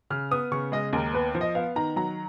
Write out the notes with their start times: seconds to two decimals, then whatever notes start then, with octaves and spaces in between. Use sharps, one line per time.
0.10 C#3 F6
0.31 B3 D#6
0.52 C#3 C#6
0.72 G#3 D#5
0.93 D#2 A#4
1.13 B3 B4
1.35 F3
1.41 D#5
1.55 B3 F5
1.76 D#3 A#5
1.96 F#3 A#5